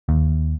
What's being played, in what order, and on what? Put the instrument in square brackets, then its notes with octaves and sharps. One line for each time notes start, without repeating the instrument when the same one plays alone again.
[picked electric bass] D#2